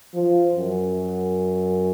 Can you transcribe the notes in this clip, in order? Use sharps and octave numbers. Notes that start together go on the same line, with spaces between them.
F3
F#2